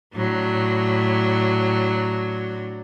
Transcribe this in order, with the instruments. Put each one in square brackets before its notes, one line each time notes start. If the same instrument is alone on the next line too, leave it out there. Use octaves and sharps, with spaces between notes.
[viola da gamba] A2 F#3 D4